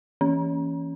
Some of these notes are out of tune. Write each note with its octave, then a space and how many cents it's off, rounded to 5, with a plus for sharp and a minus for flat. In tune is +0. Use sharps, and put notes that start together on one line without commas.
E3 +0 C#4 +5